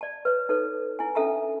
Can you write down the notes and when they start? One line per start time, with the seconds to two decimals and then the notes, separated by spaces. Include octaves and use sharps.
0.01 D5 A5
0.25 B4 C#5
0.49 D#4 A4 B4 C#5
0.99 E4 G#5
1.15 C#4 D4 A4 E5 A5 A#5